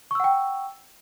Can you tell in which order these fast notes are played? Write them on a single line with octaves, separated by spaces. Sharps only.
C#6 E6 F#5 G5